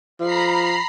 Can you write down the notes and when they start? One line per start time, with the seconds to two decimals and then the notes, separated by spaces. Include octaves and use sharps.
0.20 F3 A#5 B5 C7